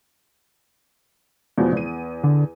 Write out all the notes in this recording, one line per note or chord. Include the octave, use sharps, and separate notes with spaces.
E2 B2 F3
E2 D#7
D3